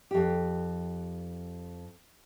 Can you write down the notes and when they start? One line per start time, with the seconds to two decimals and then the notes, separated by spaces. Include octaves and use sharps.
0.11 F2 G4